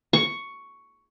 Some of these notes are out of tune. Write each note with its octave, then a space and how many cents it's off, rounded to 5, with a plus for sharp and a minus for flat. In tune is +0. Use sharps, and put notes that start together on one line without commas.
C#6 +5